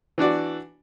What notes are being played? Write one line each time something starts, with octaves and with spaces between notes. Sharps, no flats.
E3 D4 F#4 D5